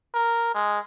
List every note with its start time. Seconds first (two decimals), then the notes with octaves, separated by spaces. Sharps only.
0.14 A#4
0.54 G#3